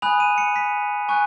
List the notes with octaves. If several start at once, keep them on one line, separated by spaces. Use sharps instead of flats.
G#5 B5 D#6 F#6 F7
D#7
C#7
B6
G#5 C#6 F#6